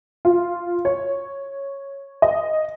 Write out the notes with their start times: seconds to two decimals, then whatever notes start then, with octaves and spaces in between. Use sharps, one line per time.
0.25 F4
0.85 C#5
2.22 D#5